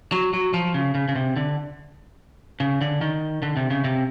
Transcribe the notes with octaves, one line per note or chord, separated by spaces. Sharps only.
F#3
F#3
F3
C#3
C#3
C#3
C3
D3
C#3
D3
D#3
D3
C3
C#3
C3